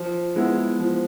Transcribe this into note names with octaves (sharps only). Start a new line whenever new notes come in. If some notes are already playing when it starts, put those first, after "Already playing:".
Already playing: F3
G#3 B3 E4
F3